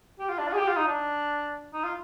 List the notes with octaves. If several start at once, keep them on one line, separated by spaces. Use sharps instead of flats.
G4
F4
D4
F4
G#4
G4
F4
D#4
D4
D#4
F4